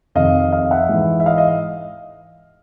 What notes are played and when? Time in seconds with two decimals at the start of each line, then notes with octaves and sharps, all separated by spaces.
0.15 F2 C3 D#3 D#5 F5
0.52 D#5 F5
0.71 E5 F#5
0.89 G#2 E3
1.20 E5
1.26 D#5 F5
1.38 D#5